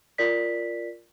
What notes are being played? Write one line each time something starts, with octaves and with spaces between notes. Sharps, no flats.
F4 A#4 D5 B6